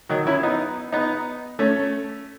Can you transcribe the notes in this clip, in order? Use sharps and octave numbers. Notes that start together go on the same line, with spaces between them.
D#3 F#3
C#4 E4
B3 D#4
B3 D#4
A3 C#4